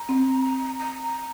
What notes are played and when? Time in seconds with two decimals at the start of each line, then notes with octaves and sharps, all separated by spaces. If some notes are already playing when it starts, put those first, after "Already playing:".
Already playing: A#5
0.09 C4
0.79 A#5
1.03 A#5